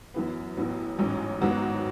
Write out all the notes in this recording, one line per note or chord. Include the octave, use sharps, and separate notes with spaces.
F#2 E3 B3
A1 A2 F#3 B3
A1 G#2 F#3 C#4
G#1 G#2 F#3 B3 F#4